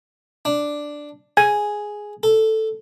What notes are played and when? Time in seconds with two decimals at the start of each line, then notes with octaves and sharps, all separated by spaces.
0.45 D4
1.37 G#4 G#5
2.23 A4